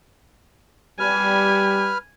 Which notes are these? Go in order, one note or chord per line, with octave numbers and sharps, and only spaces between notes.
G3 B4 G#5 F6